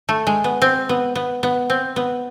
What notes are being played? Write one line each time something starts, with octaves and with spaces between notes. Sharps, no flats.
A3
G#3
B3
C4
B3
B3
B3
C4
B3